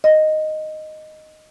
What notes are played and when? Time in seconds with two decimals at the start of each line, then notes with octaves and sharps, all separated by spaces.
0.04 D#5